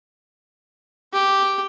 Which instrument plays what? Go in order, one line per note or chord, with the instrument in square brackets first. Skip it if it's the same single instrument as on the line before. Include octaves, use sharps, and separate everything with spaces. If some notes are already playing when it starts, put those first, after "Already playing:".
[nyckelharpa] G4